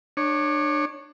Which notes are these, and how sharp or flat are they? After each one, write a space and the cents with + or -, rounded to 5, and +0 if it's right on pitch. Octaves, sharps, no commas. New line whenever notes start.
D4 +30 C#5 -5